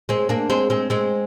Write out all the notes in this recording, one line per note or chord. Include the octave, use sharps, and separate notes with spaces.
G#3 C4
A#3 D4
G#3 C4
G#3 C4
G#3 C4